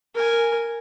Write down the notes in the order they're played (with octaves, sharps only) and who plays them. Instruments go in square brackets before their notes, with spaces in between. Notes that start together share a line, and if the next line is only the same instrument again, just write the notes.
[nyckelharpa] A#4 G#5